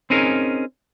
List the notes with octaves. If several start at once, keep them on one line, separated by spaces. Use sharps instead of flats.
C4 C#4 D#4 G#4 A#4